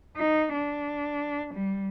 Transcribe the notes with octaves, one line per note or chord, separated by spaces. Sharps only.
D#4
D4
G3